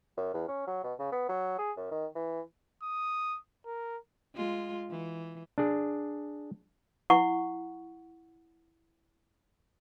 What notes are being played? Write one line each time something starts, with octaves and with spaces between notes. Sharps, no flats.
F#2
E2
C#4
F#3
B2
C#3
B3
F#3
G#4
F#2
D#3
E3
D#6
A#4
G#3 F4
E3
D4 G#4
E4 F#5 C#6